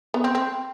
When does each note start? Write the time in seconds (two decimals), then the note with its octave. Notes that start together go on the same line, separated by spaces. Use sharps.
0.14 B3
0.24 C4
0.35 C4